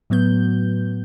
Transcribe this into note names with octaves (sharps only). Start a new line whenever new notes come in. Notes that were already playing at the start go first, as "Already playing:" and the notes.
A2 F#3 B3 G6